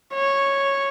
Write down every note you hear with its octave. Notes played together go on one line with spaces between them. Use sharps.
C#5